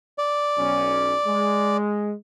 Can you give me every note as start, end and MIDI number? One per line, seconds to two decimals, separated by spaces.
0.18 1.77 74
0.57 1.14 35
0.57 1.14 61
1.26 2.13 56